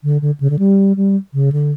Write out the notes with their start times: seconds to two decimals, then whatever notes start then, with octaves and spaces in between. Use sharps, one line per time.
0.04 D3
0.22 D3
0.40 C#3
0.50 D3
0.59 G3
0.96 G3
1.34 C#3
1.52 D3